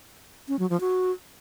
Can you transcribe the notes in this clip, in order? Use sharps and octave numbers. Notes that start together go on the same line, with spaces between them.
C#4
F#3
F3
F#4